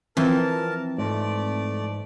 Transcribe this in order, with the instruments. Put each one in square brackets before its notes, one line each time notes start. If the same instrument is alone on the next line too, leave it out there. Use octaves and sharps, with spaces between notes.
[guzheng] E3 [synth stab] F3 C4 [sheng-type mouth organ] A#4 A5
[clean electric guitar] G#2 [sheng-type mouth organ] A3 D5